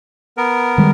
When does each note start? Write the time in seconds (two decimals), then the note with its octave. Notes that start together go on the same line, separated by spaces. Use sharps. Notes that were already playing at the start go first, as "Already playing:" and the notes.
0.37 B3 A#4
0.78 D#3 G3 G#3